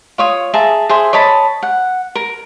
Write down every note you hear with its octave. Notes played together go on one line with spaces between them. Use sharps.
F4 C#5 D#6
G#4 E5 A5 A#5
G#4 C5 E5
C#5 D#5 A5 B5
F#5
A#4